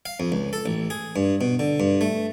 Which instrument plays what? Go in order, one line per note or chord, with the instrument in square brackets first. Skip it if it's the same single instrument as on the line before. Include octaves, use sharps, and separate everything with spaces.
[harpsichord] F5
F2
C#2
A4
A1
G#4
G2
B2
D3
G2
A3